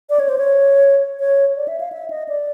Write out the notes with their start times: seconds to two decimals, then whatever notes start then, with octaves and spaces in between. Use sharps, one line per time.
0.10 D5
0.19 C#5
0.29 C5
0.38 C#5
1.20 C#5
1.56 D5
1.68 E5
1.80 F5
1.92 E5
2.10 D#5
2.29 D5